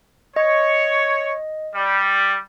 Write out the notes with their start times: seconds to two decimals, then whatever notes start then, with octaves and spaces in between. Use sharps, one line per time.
0.36 C#5 D#5
1.75 G3